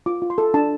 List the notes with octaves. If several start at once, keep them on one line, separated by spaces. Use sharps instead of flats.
F4 D6
F4
C6
A4
D4 A5